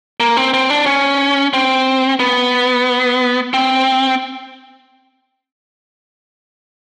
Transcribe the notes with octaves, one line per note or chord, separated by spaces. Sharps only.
A#3
C4
C4
D4
C#4
C4
B3
C4